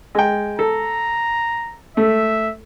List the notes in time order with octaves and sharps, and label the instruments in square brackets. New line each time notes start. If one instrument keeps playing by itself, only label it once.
[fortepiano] G#3 G5
[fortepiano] A4 [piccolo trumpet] A#5
[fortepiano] A3 [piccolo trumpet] E5